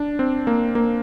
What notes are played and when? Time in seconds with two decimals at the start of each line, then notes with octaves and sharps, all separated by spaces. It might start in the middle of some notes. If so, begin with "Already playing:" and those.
Already playing: D4
0.19 C4
0.47 A#3
0.75 A#3